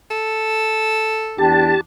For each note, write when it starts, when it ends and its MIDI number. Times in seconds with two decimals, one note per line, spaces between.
0.11 1.45 69
1.38 1.73 40
1.38 1.73 62
1.38 1.81 67
1.38 1.81 81